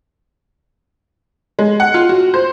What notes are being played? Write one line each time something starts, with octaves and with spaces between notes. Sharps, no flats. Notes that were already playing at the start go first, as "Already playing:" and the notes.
G#3
F#5
F4
F#4
C5